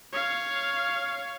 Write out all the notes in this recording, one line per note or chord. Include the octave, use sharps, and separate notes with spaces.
C#5 F5